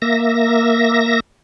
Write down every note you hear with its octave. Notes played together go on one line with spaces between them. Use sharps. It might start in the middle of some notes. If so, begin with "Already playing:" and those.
A#3 E5 A#6